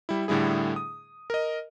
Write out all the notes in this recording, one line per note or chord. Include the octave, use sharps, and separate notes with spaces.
G3 E4
A2 D3 G3 E4 G#4
D#6
A#4 D#5